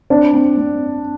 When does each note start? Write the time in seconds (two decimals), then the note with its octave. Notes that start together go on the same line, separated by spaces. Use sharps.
0.10 C4 D4
0.33 C4
0.57 C4